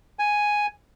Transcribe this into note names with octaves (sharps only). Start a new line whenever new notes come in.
G#5